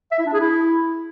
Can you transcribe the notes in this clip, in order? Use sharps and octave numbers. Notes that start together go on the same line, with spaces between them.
E5
E4
D4
G#4
E4